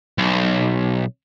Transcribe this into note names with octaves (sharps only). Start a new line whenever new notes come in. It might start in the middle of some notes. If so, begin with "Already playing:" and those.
B1